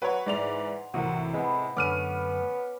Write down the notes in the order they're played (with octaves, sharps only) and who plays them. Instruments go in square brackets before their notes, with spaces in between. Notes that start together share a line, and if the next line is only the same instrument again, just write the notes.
[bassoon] F#3 [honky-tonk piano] B4 C#5 [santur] F#5 C#6 D#6 [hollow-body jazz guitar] G5
[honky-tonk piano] G#2 D5 F7 [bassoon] E3 [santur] D#4 C5 G#5
[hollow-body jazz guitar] C2 E3 A#4 [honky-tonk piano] A2 C3 [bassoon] F#4 [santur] D#6
[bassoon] G#3 [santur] B3 B4 B5 [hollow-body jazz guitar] C4
[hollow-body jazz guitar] F#2 D3 A3 [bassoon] B3 [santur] C#4 [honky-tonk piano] D6 F6 D#7